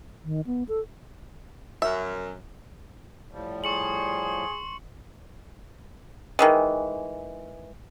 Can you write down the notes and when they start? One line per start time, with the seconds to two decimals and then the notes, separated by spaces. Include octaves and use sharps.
0.24 D#3
0.47 B3
0.69 A4
1.82 F#2 E5
3.31 A2 F3 G3
3.64 G#4 C6 C#6 C#7 F#7
6.39 D#3 E3 G#3